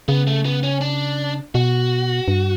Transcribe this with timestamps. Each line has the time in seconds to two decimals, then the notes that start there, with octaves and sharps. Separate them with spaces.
0.08 C#3 B3
0.27 A3
0.45 B3
0.63 C#4
0.81 D4
1.55 B2 F#4
2.28 G2